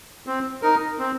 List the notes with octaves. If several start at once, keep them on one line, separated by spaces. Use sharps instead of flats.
C4
D#4 A#4
C4